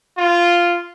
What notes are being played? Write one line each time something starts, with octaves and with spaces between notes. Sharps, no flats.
F4